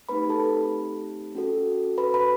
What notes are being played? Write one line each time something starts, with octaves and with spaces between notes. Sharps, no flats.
A3 C4 D#4 G4 B4 B5
A4 A5
C#4 F#4 A4
B4 B5
B4 B5